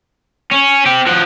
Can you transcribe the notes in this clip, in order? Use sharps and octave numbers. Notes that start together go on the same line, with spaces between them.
C#4
C4 G4
F3 F#4